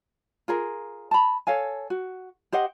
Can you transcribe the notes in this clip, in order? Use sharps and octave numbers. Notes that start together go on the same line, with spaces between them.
F4 G#4 A#4
A5 B5
A4 C#5 F5 G#5
F#4
G4 C5 D#5 F#5